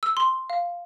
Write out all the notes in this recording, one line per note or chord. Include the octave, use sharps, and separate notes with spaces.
E6
C6
F5